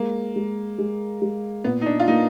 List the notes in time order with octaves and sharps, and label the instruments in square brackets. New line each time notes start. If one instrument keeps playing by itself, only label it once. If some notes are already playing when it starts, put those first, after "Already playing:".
Already playing: [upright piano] G#3 [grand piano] A#3
[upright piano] G#3
G#3
G#3
[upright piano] A#2 [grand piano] B3
[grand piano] D#4
D4
F4
[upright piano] A#3 [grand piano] D#4